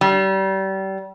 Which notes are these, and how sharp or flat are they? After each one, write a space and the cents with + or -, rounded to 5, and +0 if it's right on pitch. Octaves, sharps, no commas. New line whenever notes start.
G3 -30